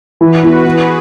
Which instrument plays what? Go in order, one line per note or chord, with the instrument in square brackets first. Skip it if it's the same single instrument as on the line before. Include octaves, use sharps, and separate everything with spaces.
[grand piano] E3 [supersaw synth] F#4 B4
[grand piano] B3 E4
[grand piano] E3 [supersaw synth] G#4